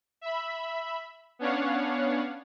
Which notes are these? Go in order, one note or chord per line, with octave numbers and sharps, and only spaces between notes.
E5 B5
B3 C#4 D4 C#5 F5 F#5